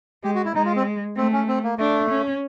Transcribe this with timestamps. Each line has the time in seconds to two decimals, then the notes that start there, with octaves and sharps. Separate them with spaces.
0.24 G#3 G4
0.35 F#4
0.45 E4
0.55 G#3 D#4
0.65 F4
0.76 C4
1.17 A3 C4
1.32 C#4
1.48 C4
1.64 A#3
1.79 A3 D4
2.10 C#4